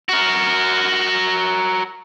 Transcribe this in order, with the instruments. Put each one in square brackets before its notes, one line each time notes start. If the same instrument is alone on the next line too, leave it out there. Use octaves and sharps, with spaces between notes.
[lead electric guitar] F#4 A#4